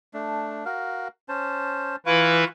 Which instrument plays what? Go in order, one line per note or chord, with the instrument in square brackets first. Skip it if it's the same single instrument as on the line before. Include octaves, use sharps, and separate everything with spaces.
[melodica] A3 D4
F#4 A#4 F5
C#4 C5 A5
[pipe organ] E3 E4 B4 [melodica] F4 F5 C#6